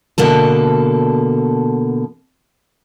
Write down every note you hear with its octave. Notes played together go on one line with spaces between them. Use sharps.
B2 D3 A#3 A4